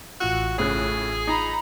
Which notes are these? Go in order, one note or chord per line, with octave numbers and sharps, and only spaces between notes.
A1 F4 F#4 E6
A2 C#3 G#4 F#6
D#4 A#5 B5